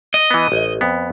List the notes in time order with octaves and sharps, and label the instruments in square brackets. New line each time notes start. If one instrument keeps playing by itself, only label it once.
[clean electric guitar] D#5
[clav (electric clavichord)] E3 B3
A1
F2 B3